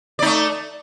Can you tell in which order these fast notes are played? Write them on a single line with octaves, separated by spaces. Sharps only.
D5 D#4 A3